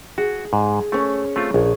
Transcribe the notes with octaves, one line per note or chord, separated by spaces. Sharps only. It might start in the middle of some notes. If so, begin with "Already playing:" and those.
F#4 G#4
G#2
A3 C#4 C#5
A3 C4 F4
A#1 G#4